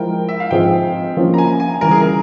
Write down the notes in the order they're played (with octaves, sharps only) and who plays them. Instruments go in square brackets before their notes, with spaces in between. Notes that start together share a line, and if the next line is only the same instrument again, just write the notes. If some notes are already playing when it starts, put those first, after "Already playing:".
Already playing: [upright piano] F3 G#3 E4 A#4 [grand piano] G5
[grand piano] E5
F5
[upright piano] G#2 F3 C4 F4 G#4 [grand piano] G5
[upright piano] F3 A#3 C#4
[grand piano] A#5
G#5
G#5
[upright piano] C#3 E3 G3 [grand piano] A#4
[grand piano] G#4
A#4